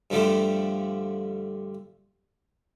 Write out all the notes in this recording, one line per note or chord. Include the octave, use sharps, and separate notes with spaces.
G2 D3 F3 G3 A3